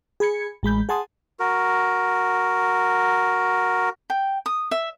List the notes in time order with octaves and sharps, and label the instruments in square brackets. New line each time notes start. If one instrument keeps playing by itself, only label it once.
[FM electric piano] G#4 B5 G#6 C#7
A1 G#3 B5 G6
G#4 F#5 G#5 A5 C6 D#6
[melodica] F#4 A#4
[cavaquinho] G5
D#6
E5